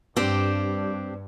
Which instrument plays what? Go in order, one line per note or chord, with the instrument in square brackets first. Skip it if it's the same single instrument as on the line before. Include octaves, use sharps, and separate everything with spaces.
[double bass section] G2 [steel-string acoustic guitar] C4 D4 G4